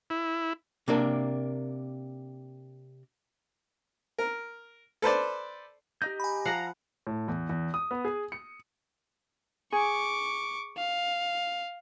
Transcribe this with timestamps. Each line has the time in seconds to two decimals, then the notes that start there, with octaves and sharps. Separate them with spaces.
0.10 E4
0.88 C3 A#3 D4 A#4
4.18 A#4
5.02 A4 B4 C5 D5
6.02 D#4 G4 D#5 G6
6.20 G#5 B5
6.45 F3 F5 F#5 A#5
7.07 A2
7.28 E2
7.49 E2
7.74 D#6
7.91 B3
8.05 G#4
8.32 C#7
9.72 G#4 C#6 D6
10.77 F5